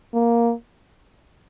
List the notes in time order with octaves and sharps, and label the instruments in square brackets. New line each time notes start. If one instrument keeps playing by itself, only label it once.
[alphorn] A#3